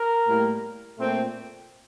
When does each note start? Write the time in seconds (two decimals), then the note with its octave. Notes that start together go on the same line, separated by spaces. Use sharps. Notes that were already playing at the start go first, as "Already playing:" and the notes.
Already playing: A#4
0.26 A2 G3 A#3
0.97 A#2 A3 C4